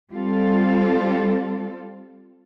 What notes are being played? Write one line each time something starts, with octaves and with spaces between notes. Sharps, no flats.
G3 C4 F4 A4